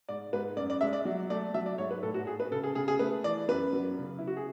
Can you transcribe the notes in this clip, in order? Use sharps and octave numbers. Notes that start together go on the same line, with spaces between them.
G#2 D5
G#2 B4
F#2 D5
D5
G#3 E5
D5
F#3
A3 D5
F#3 E5
D5
G#2 C#5
B4
A2 A4
F#4
A2 G#4
B4
C#3 A4
G#4
C#3 G#4
G#4
A3 B4
E3 D5
F#2 B4
F#3
C#3
C#3 E4
F#4
G#4